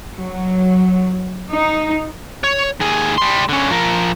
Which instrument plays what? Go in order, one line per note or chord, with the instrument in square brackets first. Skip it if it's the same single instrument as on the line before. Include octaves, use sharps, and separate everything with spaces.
[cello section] F#3
D#4
[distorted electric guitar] C#5
D#2 G#4
G3 C6
D3 C#4
F3 A#4